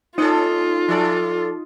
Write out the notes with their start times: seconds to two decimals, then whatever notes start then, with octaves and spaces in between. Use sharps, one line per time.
0.18 A#3 C#4 D#4 F4 A4
0.88 F3 A4 D5